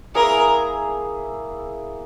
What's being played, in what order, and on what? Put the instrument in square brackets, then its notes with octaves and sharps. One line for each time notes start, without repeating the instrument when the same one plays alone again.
[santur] A#3 E4 G#4 E5 [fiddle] A#4